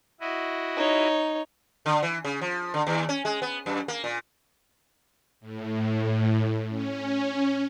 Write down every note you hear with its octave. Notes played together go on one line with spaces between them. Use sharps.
E4 F#4 D#5
D#4 C#5
D3
E3
C#3
F3
D3
D#2
C#4
G#3
B3
F#2
A#3
A#2
A2
C#4